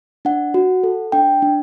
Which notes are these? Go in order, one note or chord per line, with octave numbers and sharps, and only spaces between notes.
D4 F#5
F#4
A4
D4 G5
D4